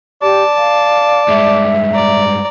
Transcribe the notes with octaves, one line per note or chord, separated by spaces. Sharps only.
G4 D5 A5
F5
G2 G#3 E5
D5 A#5